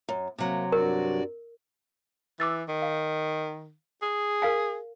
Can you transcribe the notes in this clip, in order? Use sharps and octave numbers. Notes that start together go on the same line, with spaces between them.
F#2
C3 F#3 A#3
G2 F#4 A#4 D5
E3 D6 E6 A6
D#3
F5
G#4
A#4 F5 G#5